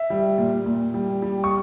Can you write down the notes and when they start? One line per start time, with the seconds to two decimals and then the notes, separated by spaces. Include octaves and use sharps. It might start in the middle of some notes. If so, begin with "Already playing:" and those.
Already playing: E5
0.10 G3
0.38 A#2
0.66 A#2
0.94 G3
1.22 G3
1.44 C#6